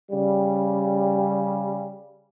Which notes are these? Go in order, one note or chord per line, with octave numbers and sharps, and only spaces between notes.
C#3 G3